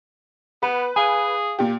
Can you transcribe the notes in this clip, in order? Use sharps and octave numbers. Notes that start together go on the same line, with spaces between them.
B3 B4
G#4 F5 G#5
A#2 G4